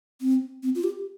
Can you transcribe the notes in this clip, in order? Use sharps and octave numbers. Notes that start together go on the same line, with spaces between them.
C4
C4
F4
G4